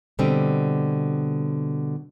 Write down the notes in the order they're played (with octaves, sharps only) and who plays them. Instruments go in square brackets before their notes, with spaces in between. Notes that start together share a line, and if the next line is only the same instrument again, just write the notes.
[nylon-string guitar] B2 D3 G3 C4